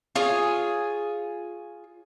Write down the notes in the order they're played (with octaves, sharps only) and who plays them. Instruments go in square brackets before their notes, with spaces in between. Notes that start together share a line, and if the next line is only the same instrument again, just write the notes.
[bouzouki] F4 G#4 C#5